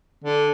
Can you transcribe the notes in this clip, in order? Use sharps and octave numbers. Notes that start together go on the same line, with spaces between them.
D3